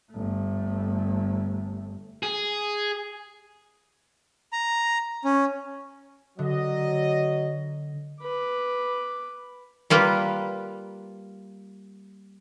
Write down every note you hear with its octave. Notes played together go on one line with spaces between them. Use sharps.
G1 A3
G#4
A#5
C#4
D3 F#3 D#5
B4 D6
G3 A#3 F4 B4